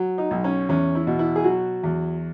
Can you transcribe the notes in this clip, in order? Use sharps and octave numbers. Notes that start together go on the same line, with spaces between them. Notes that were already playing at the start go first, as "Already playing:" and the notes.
Already playing: F#3
D#4
B1
C#4
E2 C#4
E4
B2
E4
G#4
F#3 F#4
E2